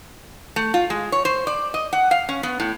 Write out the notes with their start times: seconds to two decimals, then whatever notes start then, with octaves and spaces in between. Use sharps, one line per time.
0.56 A3
0.74 F4
0.90 G#3
1.12 C#5
1.25 C5
1.47 D5
1.74 D#5
1.93 F#5
2.11 F5
2.29 C#4
2.43 B3
2.60 A2